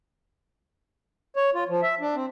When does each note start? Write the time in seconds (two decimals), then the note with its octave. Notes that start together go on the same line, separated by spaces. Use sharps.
1.36 C#5
1.55 F4
1.68 F3
1.82 E5
2.01 D4
2.15 C4